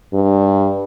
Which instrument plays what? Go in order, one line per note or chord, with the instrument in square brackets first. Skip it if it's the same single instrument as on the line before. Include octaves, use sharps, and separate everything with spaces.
[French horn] G2